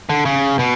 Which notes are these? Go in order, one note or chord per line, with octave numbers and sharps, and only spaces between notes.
D3
C#3
B2